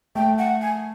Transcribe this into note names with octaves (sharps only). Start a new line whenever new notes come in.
A3 G5
F#5
G#5